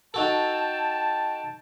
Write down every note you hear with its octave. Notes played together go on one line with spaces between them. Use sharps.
D#4 F#4 A4 G5 A5